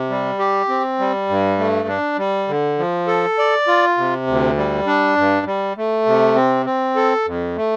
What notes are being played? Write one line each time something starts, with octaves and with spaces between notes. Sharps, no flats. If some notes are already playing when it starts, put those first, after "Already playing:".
Already playing: C3
G3
G4
C4
G3
G2
A3
D4
G3
D3
F3
A4
D5
F4
C3
D2
G3
D4
G2
G3
A3
C3
C4
C4
A4
F2
A3